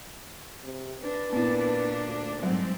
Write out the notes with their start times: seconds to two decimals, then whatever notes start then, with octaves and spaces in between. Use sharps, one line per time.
0.64 C3
1.03 D4 B4
1.33 A#2 B3 C4 D4 E4
2.05 D2
2.43 G#2 F#3 G3 C4